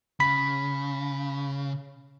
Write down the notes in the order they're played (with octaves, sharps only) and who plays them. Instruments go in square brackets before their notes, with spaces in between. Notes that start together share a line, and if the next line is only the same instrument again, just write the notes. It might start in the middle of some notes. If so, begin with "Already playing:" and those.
[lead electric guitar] C#3 [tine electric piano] B5 B6